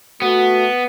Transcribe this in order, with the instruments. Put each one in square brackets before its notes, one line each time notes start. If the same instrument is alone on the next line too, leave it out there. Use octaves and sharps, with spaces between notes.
[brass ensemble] A3 F#4 [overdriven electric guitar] B3